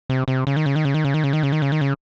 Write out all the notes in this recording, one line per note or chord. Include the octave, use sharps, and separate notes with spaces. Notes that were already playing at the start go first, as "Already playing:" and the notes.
C3
C3
C#3
D#3
C#3
D#3
C#3
D#3
C#3
D#3
C#3
D#3
C#3
D#3
C#3
D#3
C#3